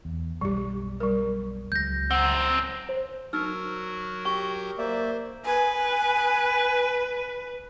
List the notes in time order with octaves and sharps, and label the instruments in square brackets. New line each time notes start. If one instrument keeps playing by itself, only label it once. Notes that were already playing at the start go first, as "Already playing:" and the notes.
[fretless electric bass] E2
[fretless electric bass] B1 F#2 G#3 [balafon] G3 G4
[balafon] G3 A#4
[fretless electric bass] C#2 F#3 G#3 [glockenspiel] G6 A#6
[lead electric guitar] F#2 C4 [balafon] F#5
[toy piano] C5
[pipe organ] F#3 F#4 A#4 [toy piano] D#4 [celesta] E6 F6
[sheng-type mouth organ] G4 G6 [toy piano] G5 [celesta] C#6
[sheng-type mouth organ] A#3 D5 E5 [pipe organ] C5
[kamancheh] B4 [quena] G#5